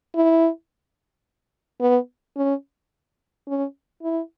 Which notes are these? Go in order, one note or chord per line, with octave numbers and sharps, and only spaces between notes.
E4
B3
C#4
C#4
E4